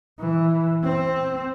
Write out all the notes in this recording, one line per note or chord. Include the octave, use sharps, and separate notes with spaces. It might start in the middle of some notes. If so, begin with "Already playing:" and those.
E3
C4